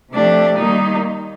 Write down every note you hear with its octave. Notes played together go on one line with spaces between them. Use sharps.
C3 F3 A3 D4 G4
D#3 G3 A#3 D#4